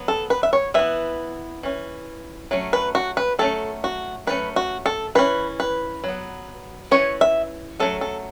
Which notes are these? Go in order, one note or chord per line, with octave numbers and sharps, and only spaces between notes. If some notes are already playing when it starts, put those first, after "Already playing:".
Already playing: F#3 B3
A4
B4
E5
C#5
E3 B3 E5
E3 C#4
F#3 A3 C#4
B4
F#4
B4
F#3 A3 C#4 A4
F#4
F#3 A3 C#4 B4
F#4
A4
E3 C#4 B4
B4
F#3 B3
E3 C#4 C#5
E5
F#3 A3 C#4 A4
A4